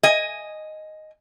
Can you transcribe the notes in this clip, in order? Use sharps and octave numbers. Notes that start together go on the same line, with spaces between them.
D#5 G#5